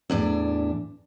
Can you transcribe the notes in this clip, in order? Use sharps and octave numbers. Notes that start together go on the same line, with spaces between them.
E2 A2 D4